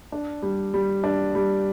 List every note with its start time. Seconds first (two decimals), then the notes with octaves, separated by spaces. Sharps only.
0.12 D4
0.42 G3
0.74 G3
1.04 D4
1.35 G3